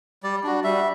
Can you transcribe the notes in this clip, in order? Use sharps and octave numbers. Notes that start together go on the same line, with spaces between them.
G3 D5
D4 F#4
G3 E5